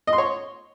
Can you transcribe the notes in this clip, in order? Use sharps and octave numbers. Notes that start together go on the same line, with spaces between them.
D#5
C6
C#5